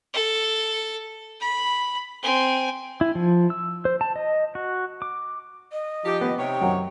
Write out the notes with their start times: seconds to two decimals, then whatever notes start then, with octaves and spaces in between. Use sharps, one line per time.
0.13 A4
1.41 B5
2.23 C4 G#5
3.01 E4
3.15 F3
3.50 E6
3.85 C5
4.01 A5
4.16 D#5
4.55 F#4
5.02 D6
5.72 D#5
6.05 F3 D#4 G4
6.21 B3
6.38 C3 D#4 C#5 G5
6.61 F#2 F#3